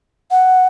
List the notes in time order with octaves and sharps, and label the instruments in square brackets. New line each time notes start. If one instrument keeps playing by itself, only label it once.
[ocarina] F#5